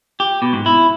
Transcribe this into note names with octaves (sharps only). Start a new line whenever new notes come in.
G4
B2
G#2
E4